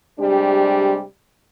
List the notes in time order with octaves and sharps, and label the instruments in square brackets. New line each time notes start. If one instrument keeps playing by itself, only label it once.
[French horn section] C3 G3 G#3 D4 G4